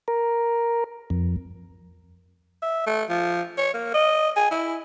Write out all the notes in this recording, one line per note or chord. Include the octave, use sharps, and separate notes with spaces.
A#4
F2
E5
A3
F3
C#5
A#3
D#5
G#4
E4